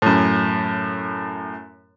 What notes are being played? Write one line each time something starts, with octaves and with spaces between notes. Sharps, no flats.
F#2 A2